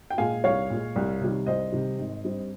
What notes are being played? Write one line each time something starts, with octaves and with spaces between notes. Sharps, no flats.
G5
A#2 G#3 F5 G#5
C2 C#5 F5
A#2 G#3
C2
C3 D#3 G3
C2 C5 D#5
C3 D#3 G3
G#1
G2 G3 C4